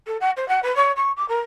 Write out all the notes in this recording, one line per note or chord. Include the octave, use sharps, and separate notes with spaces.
A4
F#5
C5
F#5
B4
C#5
C#6
D6
A#4